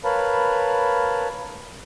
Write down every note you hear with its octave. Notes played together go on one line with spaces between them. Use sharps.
A#4 B4 C#5 F5 A5 B5